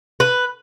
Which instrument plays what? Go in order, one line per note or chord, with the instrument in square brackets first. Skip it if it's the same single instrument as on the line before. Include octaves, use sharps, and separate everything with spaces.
[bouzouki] B4